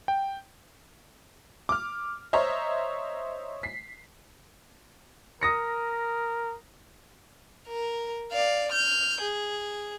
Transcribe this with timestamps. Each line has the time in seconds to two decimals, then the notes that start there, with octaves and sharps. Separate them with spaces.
0.08 G5
1.69 D6 F6
2.33 C5 C#5 D#5 E5 A#5
3.63 B6 C7
5.41 A#4 D#6 A#6 C#7
7.68 A#4
8.32 D5 F5
8.72 F6 G6
9.21 G#4